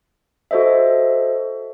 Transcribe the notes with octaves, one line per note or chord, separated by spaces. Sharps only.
F#4 A4 C5 D#5 E5